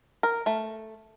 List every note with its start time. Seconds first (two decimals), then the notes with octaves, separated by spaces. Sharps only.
0.23 A#4
0.46 A3